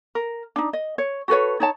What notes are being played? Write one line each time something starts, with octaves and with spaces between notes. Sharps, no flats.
A#4
D4 D#4
D#5
C#5
F#4 A4 B4 C#5
D#4 C#5 A5